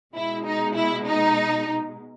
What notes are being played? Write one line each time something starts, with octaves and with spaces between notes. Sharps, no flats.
B2 G#3 E4
D#4
E4
D#4